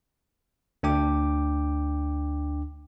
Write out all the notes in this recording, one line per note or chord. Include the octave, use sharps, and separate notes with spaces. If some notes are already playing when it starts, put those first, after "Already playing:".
D2 D4 G5 D6